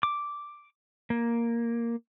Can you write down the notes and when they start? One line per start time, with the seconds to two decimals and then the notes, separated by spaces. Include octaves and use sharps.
0.03 D6
1.10 A#3